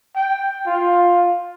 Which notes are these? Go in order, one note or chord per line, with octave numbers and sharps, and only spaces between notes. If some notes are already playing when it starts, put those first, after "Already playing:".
G5
F4